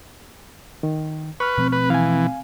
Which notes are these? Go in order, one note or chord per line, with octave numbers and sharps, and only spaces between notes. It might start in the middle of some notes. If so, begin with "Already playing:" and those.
D#3
B4 C#6 F6
B2 F3 A3 C4
B4
E3 F5 G#5